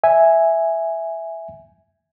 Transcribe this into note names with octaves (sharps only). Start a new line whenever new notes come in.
E5 G#5